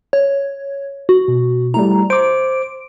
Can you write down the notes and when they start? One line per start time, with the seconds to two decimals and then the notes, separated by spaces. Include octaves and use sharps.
0.13 C#5
1.09 F#4
1.28 B2
1.74 G3 A3 E4 A#5
2.10 C5 D6 D7